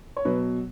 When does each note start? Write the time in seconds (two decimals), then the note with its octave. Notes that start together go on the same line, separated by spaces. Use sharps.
0.17 C#5
0.25 B2 F#3 B4